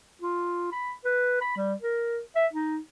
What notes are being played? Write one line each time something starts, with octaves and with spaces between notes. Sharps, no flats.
F4
B5
B4
B5
G3
A#4
E5
D#4